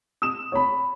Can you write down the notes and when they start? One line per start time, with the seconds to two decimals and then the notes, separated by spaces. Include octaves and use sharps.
0.22 D#6 E7
0.52 C#5 B5